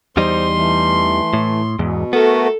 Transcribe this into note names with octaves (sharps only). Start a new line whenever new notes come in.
E2 G3 D#4 C5 C6
E3 A3
A2
E2 G#2 B2
A3 B3 F#4 A4 A#4